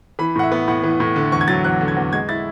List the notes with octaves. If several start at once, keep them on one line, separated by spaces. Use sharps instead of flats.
E3 B5
A2 F#5
E5
B3
A2 F#5
E3
A2
D3
E2 C#6
G#6
F#3 A6
E2 F#6
D3
G#6
E2
G#3 G#6
E4 A6